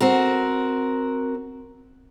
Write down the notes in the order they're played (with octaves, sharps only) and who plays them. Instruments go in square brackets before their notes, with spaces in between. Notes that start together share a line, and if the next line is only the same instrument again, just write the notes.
[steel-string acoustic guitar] C4 F#4 A#4